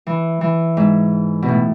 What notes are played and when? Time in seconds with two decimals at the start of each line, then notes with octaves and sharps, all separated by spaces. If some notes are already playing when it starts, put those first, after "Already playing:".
0.07 E3
0.41 E3
0.77 G#2
1.42 B2
1.48 A2